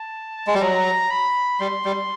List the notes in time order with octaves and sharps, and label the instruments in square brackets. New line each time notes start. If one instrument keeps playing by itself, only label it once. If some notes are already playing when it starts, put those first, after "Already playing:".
Already playing: [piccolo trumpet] A5
[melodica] G#3
G3
[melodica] F#3 [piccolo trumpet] A#5
[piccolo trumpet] B5
[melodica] G3 [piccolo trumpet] C6
[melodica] G3